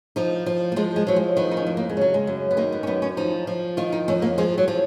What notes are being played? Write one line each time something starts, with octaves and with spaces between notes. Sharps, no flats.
F3 D#4
F3
A#3
F3 G#3
G#3
F3 F#3
G#3
D#3 B3
D#4
C#4
F2
A#3
G#3
C#3 F#3
G#3
F#2
B3
D#3 A#3
B3
C#4
F#2 B3
C#4
F3 D#4
F3
D#3 F4
D#4
F2 C#4
A#3
F3 G#3
F#3
F3